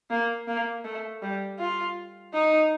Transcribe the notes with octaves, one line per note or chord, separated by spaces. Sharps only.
A#3
A#3
A3
G3
F4
D#4